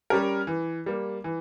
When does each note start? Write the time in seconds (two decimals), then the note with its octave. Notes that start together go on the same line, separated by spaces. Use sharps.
0.10 G3 C#4 G4 A#4
0.47 E3
0.86 G3 A#3
1.24 E3